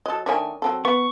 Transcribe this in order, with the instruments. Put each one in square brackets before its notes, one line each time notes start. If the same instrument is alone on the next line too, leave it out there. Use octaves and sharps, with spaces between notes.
[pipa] F#3 A4 [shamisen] D#5
[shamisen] D#3 A3 D4 [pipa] A#4 C#5 G#5
[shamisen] F#3 C4 A4
[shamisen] B3 [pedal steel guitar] C#6